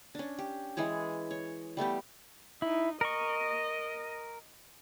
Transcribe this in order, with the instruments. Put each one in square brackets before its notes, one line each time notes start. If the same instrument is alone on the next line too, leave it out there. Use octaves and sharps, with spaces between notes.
[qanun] C#4 D4
G4
E3 G#3 G#4 C#5
C#5
G3 A3 B3 G4
[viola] D#4 [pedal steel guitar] E4
[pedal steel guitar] A#4 C#6 [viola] D#5